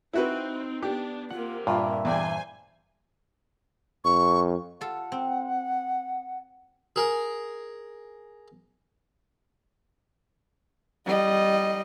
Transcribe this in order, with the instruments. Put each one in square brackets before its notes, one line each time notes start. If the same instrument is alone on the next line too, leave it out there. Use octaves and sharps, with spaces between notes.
[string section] C4 [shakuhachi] D#4 [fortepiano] E4 F#4 B4
[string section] B3 D4 [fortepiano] G4
[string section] C3 A#3 [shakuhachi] F4 [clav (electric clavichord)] F#5
[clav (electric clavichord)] G2 A#2 [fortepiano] F4 [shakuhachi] E5
[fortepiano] E2 D5 G5 [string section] C5 G#5
[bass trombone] F2 [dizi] C#6
[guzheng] F4 A4 [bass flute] F#5
[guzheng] C4
[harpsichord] G#4 A#4
[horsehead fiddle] G3 D#5